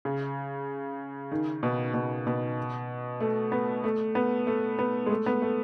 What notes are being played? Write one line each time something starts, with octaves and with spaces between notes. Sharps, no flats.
C#3
D#3
B2
B2
B2
A3
B3
A3
B3
A3
B3
G#3
A3
B3
A3